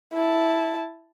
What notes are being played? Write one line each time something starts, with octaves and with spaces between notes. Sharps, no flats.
E4 A5